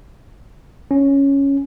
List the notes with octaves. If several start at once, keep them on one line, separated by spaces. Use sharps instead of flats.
C#4